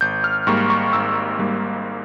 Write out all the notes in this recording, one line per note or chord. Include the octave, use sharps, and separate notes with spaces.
G#1 G6
F6
G#2 G3 A#3 C#6
C#6
G#1 E6
G#2 G3 A#3